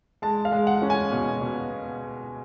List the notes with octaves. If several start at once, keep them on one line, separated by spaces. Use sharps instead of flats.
G#3 A5
F5
G#3
F#5
C#4
G#5
B2
B2